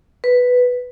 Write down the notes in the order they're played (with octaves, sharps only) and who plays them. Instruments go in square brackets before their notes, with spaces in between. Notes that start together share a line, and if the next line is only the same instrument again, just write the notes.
[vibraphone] B4